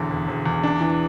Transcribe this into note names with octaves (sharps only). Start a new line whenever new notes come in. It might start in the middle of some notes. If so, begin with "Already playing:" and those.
Already playing: E1 E2 D3
E1
E1
E2
D4
E3